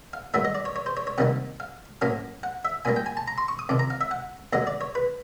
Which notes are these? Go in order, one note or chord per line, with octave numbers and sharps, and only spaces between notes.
F5
G2 D#3 F#3 A3 E5
D#5
D5
C#5
C#5
C5
C#5
C#5
C3 D#3 G3 A#3 D#4 F#5
F5
A2 F#3 A#3 C#4 F5
F#5
E5
A#2 G3 A#3 G#5
G5
G#5
A5
A#5
C6
C#6
D#6
F2 C3 D#3 D6
A#5
F5
E5
F#5
D#2 D3 F#3 D#5
D5
C#5
B4